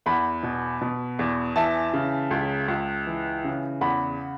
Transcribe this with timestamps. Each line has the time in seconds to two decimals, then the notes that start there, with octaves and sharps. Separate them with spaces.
0.06 E2 F#5 B5
0.43 B2
0.82 B2
1.19 E2
1.56 E3 E5 A5
1.94 C#3
2.31 C#2
2.68 C#2
3.07 E3
3.44 C#3
3.81 E2 F#5 B5